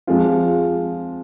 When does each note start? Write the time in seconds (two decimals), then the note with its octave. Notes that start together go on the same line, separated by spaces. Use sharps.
0.07 F3 G#3 C4 F4